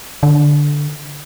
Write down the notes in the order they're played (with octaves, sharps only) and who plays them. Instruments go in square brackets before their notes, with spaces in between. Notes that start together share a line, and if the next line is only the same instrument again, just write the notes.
[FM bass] D3